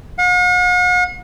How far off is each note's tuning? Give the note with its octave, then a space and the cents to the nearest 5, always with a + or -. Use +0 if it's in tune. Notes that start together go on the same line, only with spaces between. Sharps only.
F#5 -45